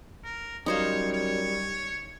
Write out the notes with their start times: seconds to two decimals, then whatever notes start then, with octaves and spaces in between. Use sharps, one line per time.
0.24 A#4
0.66 F#2 G3 D#4 C5 C#5 F5
1.13 C#5